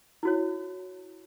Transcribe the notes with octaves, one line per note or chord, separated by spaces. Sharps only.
E4 F#4 C#5